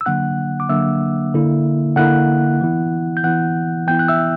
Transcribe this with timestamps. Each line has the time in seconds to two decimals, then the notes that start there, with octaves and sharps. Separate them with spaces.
0.01 E6
0.06 D3 F#3 A#3 D4 F#5 F#6
0.60 D6
0.69 D3 F#3 A#3 D4 E5 E6
1.34 D3 A#3 E4
1.96 D3 A#3 E4 F#5 F#6
2.61 E3 B3 E4
3.17 G6
3.24 E3 B3 E4 F#5 F#6
3.87 E3 B3 E4 G5 G6
3.99 F#6
4.08 E5 E6